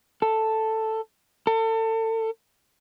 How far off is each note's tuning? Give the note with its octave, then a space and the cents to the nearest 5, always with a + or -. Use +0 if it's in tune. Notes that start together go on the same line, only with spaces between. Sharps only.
A4 +5
A4 +30